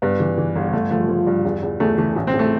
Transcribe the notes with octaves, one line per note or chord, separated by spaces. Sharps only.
G2 B3
E3
E3
G1
G1 A3
F3 A3
F3
G2
E2
E2
E2 A3
E3 A3
A1
C4
A1
A3